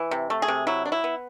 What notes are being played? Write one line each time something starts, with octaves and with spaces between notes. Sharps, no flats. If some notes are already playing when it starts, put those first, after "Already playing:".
Already playing: E3
C3
A3
G#4
C3
F#3 E4
D4
E4
B3